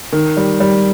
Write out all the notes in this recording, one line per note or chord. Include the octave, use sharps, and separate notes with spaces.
D#3
G3
G3